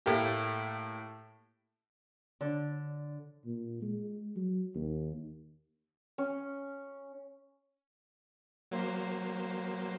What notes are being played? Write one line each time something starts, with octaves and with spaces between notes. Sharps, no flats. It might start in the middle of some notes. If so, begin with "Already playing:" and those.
A2 A3 A#3 G4
D3
A#2
G#3
F#3
D#2
C#4
F#3 A#3 C5